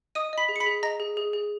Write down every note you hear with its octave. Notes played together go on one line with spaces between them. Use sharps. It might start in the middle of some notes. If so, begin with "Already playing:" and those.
D#5 D#6 D#7
D#5 B5 B6
G#4
C#7
B5 B6
G#4
D#5 A#5 A#6
G#4
G#4
G#4